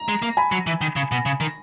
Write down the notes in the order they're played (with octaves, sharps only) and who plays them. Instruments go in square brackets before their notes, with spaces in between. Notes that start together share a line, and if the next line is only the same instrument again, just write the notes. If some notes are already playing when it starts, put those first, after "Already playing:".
Already playing: [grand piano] A#5
[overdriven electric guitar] G#3
A#3
[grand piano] G#5 B5
[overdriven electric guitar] F#3
E3
D#3
C#3
B2
C#3
D#3